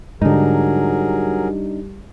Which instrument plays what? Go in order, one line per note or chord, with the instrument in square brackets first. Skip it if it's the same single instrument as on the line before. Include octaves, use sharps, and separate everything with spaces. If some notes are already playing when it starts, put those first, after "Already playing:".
[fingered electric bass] G#2 D3 [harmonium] F#3 G#4 A#4 [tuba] G3 [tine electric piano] D4 D#4